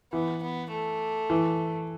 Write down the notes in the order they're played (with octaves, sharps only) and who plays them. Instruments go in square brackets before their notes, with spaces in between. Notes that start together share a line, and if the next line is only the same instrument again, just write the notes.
[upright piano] E3 [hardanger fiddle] B3
[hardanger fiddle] B3
A3
[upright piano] E3